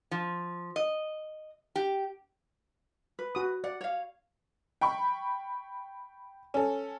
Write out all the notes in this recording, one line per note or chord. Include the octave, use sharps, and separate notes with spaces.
F3
D#5
G4
B4
F#4 D#6
D5 F#5
C#5 F5
G5 B5 C#6
C#4 A4